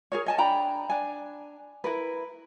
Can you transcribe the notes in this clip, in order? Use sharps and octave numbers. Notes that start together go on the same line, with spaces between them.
G#4 A#4 C#5
D#5 G#5 A5
D4 G5 A#5 B5
D4 G#5
E4 A#4 B4